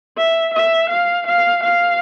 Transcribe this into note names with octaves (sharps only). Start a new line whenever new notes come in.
E5
E5
F5
F5
F5